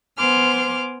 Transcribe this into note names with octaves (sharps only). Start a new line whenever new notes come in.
B3 C5 G#5 C6 D6 F6